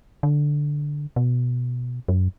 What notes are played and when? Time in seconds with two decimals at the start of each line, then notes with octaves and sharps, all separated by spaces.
0.23 D3
1.16 B2
2.08 F#2